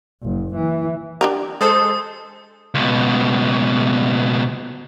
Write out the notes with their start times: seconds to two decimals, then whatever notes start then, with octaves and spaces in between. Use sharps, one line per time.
0.23 F#1
0.56 E3
1.21 D4 G4 A#4
1.61 G#3 A4 C5 D#6
2.74 C#2 B2